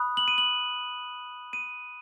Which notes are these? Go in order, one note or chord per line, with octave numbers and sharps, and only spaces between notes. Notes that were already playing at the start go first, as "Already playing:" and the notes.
Already playing: B5 D#6 F#6
F#7
D#7
F#7
D#7